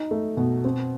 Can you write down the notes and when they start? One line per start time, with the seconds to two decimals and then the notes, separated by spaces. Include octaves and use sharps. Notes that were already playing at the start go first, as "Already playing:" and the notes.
Already playing: D#4
0.11 A3
0.37 B2
0.64 C4